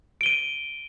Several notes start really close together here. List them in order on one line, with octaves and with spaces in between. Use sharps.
D7 G7 D#7